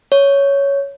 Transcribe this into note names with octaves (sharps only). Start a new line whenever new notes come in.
C#5